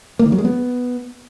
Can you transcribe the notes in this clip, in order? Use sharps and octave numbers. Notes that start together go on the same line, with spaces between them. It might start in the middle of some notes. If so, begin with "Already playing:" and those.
A#3
D#3
F#3
G#3
B3